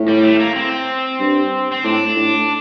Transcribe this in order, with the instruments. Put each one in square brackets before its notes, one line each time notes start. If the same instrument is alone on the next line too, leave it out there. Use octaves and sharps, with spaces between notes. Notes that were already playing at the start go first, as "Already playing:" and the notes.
Already playing: [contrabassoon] A2
[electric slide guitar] G3
A3
A#3
C4
[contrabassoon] G2
[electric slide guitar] C4
[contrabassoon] A2 [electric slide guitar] D4
[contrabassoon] A2